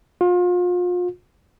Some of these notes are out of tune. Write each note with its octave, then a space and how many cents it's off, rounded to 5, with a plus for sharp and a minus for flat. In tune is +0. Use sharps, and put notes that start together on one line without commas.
F4 +35